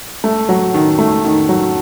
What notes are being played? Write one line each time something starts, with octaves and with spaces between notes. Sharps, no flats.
A3
F#3
D#3
A3
D#3
F#3